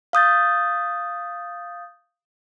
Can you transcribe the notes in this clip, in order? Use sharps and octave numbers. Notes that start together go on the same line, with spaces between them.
F5 D#6 G6 A6